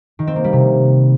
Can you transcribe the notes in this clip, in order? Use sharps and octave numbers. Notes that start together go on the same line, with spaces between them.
D#3
C4
A#3
G3
C3